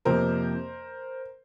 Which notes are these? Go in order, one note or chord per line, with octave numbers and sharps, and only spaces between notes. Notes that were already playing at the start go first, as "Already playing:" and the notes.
F2 C3 F3 A#3 A#4 C5